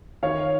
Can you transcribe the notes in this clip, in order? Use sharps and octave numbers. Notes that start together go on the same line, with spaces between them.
D#3 C#5 F5